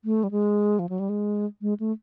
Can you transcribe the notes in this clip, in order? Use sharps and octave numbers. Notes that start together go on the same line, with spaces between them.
A3
G3
G#3
F3
F#3
G3
G#3
G#3
A3